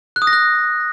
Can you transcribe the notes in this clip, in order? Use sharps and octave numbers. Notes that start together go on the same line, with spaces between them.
F#6
D#6
A#6
F#6